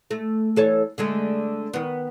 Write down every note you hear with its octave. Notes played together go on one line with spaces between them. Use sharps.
A3
E3 A4 C#5
D3 G#3 A3
D#3 B3